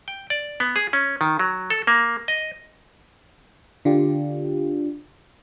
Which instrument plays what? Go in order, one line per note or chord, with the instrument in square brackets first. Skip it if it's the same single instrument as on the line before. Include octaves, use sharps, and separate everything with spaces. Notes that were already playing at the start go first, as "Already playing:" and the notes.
[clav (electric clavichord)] G5
D5
B3
G#4
C#4
D#3
F#3
A4
A#3
D#5
[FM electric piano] D3 D4 F4 G4